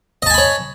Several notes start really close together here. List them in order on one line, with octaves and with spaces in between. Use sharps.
D#5 A5 G#5 B5 C#5